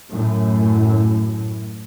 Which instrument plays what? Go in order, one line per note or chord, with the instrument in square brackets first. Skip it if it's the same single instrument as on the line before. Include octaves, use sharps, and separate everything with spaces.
[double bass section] F#2 A2